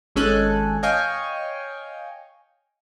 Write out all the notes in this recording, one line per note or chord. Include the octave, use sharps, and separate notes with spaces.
G#1 G#3 C#4 A4 G#5 F#6
C#5 D#5 F5 G5 G#5 C#6